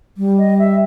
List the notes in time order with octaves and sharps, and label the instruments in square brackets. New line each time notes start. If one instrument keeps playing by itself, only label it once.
[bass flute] G3
[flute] D#5
E5